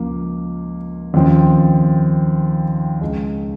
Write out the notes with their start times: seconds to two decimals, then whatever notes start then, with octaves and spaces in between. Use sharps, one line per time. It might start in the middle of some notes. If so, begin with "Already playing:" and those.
Already playing: C#2 F3 A#3
1.14 D#2 C#3 F3 C4
3.01 C#2 C#3 G#3